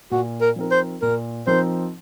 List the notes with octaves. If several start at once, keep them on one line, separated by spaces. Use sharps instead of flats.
A#2 F#4
A#4
F3 C4 D#4 A#4
C5
A#2 A#4
F3 C4 D#4 A#4 C5